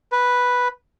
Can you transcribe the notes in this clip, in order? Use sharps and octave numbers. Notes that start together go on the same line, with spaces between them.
B4